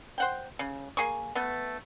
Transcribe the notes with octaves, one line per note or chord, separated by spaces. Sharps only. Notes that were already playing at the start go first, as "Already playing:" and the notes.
C5 F#5 G5
C#3
A#3 G#4 C#6
A3 B3